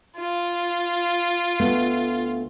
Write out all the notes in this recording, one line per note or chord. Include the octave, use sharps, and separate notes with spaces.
F4
D2 A3 B3